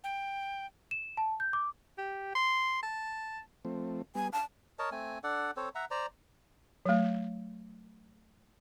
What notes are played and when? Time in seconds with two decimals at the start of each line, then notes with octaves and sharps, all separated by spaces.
0.04 G5
0.91 E7
1.17 A5
1.40 G6
1.53 D6
1.98 G4
2.35 C6
2.83 A5
3.65 F3 A3 C4
4.15 G3 B3 G#5
4.33 F5 A5
4.79 A#4 C#5 D#5 A5
4.91 A3 C4 G#5
5.24 D4 A4 D5 F#5
5.57 C4 A4 C5 C#5
5.75 E5 F#5 A#5
5.91 C5 D5 A#5
6.85 F#3 A3